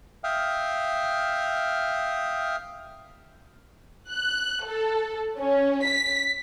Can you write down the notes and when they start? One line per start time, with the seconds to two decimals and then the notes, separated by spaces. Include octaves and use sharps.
0.24 E5 F5 G5 D#6 F6
4.09 F#6
4.66 A4
5.38 C#4
5.85 B6